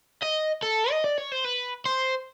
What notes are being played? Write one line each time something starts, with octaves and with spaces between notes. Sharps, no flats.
D#5
A4
D#5
D5
C#5
C5
B4
C5